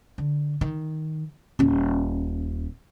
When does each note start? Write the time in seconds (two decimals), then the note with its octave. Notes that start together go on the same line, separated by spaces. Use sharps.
0.18 D3
0.61 D#3
1.59 D#1 C#4